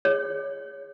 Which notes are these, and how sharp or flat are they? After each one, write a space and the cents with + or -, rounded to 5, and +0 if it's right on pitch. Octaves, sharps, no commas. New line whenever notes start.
G#4 -15 C#5 +0